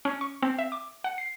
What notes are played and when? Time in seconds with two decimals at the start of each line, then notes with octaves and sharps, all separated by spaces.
0.05 C#4
0.21 C#6
0.42 C4
0.59 E5
0.72 D6
1.04 F#5
1.18 C7